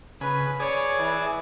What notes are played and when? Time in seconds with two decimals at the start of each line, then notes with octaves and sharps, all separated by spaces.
0.21 C#3 B4 G#5 B5
0.60 G#4 C#5 D5 G#5
1.00 E3